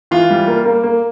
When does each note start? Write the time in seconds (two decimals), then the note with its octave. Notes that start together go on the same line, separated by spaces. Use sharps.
0.11 E3 F4
0.30 G3
0.47 A#3
0.66 A#3
0.84 A#3